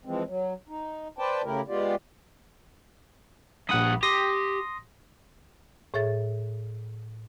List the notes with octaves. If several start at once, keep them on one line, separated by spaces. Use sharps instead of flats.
E3 F3 G#3 C4
F#3
D#4
B4 C5 D5 G5 A5
C#3 A3 E4 G4 A#4
G#3 B3 F4 G4 D5
A#1 G2 F#5 B5 D#6
G4 C6 D#6 A#6
A2 G#4 C#5 E5 A6